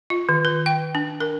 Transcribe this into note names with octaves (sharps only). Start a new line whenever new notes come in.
F4
D#3
B4
G5
D4
A#4